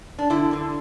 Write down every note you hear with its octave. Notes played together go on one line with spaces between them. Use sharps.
D4
D3 E4
D3